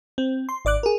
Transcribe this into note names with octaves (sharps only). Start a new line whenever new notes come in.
C4
C6
G#1 D5 D6 F#6
G#4 A#4